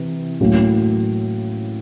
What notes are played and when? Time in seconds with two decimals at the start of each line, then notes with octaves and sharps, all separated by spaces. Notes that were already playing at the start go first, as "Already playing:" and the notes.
Already playing: C3 E3
0.40 A2 F#3 A#3 C#4